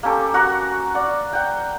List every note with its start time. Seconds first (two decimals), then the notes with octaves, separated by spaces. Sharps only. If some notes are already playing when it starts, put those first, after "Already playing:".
0.03 A#3 C#4 G4 A4
0.34 F#4 A#4 F#5
0.94 D5 F#5
1.33 F#5 G5